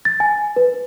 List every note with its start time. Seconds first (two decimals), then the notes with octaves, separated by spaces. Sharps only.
0.05 A6
0.20 G#5
0.56 B4